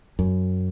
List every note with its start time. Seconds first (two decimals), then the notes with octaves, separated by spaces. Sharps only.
0.19 F#2